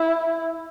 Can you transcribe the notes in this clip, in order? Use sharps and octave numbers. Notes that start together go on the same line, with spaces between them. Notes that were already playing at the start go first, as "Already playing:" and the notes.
Already playing: E4